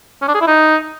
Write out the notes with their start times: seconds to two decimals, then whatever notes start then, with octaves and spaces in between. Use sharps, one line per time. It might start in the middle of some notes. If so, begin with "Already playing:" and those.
0.22 C#4
0.28 D4
0.34 G#4
0.41 E4
0.47 D#4